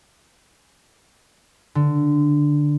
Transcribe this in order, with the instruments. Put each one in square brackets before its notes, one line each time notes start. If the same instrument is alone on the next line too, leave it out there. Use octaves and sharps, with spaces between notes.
[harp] D3